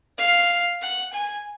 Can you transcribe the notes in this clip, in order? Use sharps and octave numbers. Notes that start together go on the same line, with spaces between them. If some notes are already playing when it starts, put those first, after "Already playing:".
F5
F#5
G#5